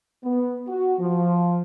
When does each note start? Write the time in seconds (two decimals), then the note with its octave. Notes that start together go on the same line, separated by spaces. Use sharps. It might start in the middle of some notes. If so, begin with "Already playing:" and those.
0.24 B3
0.68 F#4
1.00 F3